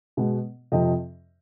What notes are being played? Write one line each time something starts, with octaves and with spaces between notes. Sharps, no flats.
B2 G#3 B3
F2 C3 F3 D#5 G5